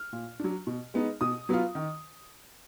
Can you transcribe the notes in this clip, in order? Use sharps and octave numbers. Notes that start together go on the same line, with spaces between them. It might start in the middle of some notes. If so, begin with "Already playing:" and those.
Already playing: F6
A#2
F#3 D4
B2
G#3 B3 D#4
B2 D#6
F#3 B3 F4
D#3